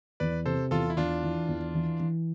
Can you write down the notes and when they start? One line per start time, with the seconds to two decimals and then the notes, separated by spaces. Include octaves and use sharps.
0.20 E2 B4 D5
0.46 C3 A4 C5
0.71 E2 F4 A4
0.90 E4
0.97 E2 D4 F4
1.23 E3
1.48 E2
1.74 E3
2.00 E3